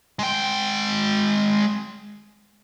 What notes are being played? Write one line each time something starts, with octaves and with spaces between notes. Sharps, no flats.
G#3 G5